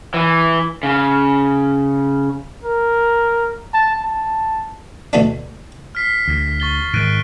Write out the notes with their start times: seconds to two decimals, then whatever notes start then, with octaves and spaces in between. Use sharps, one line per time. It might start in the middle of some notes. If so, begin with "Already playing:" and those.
0.14 E3
0.83 C#3
2.64 A#4
3.74 A5
4.03 A5
5.13 D2 B2 A3 D4
5.95 F6 B6 C7
6.28 D2
6.60 C#6 A6 G7
6.94 G#2 D#3 F#6 D7 D#7